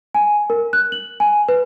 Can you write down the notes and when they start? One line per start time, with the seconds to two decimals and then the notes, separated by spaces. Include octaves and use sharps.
0.15 G#5
0.50 A#4
0.73 F#6
0.92 F#7
1.20 G#5
1.49 B4